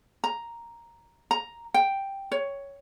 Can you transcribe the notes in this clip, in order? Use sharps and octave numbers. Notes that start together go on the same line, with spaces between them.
A#5
A#5
G5
C#5